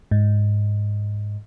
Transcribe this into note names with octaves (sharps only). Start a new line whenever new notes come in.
G#2